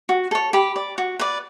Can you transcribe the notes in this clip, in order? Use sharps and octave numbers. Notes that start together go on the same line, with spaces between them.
F#4
A4 C#5
G4 B5
D5
F#4
B4 D5